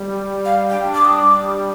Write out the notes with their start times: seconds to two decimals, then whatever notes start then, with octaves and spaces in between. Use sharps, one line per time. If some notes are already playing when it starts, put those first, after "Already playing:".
Already playing: G3
0.45 F5
0.70 D4 G5
0.94 D6
1.05 D#6
1.16 G3 D6